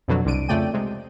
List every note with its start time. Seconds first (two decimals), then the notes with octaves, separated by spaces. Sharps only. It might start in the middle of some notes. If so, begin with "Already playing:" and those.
0.08 F2 B2 D3 F#3
0.25 C2 D3 D7 D#7
0.48 F2 C#3 A3 D5 G5 D#7
0.74 C3 G#3